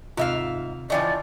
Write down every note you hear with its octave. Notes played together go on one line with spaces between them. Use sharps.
D#2 G#2 C3 F4 E5 F5
C#3 E3 F3 D5 D#5 G5